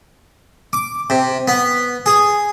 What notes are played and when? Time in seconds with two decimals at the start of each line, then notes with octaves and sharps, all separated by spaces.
0.73 D6
1.10 C3
1.48 B3
2.06 G#4